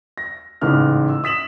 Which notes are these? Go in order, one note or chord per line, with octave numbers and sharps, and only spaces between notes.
A#6
A1 G#2 C#3 E3 F6
E6
D#6 B6 E7 F#7